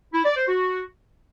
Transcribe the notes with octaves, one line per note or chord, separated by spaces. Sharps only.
E4
D5
C5
F#4